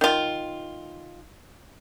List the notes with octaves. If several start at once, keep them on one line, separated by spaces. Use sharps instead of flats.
D#3 F4